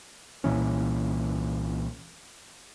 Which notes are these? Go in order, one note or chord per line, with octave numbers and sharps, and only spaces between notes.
C2 A#2 E3 C#4